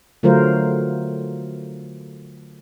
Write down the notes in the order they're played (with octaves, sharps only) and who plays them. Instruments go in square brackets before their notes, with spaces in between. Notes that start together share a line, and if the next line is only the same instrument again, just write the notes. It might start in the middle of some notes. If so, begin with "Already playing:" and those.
[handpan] D3 F#3 A3 F4 A#4 C5